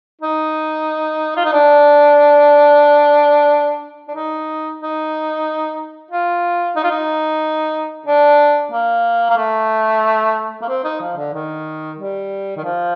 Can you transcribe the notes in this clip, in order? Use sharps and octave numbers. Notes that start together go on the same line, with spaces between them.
D#4
F4
D#4
D4
D4
D#4
D#4
F4
D#4
F4
D#4
D4
A#3
A#3
A3
A#3
C4
D#4
F3
D3
D#3
G3
D#3
F3